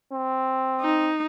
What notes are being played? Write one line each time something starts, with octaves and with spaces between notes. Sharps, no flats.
C4
D#4